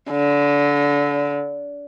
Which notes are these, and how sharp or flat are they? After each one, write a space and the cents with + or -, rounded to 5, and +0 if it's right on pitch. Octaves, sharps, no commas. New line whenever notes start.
D3 -30